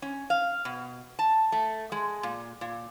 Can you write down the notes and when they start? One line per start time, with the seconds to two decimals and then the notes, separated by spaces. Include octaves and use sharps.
0.02 C#4
0.30 F5
0.65 B2
1.19 A5
1.52 A3
1.92 G#3
2.23 A#2
2.61 A#2